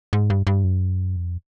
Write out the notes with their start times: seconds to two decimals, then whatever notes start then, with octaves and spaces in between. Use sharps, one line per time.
0.13 G#2
0.30 G2
0.47 G2
0.64 F#2
1.16 F2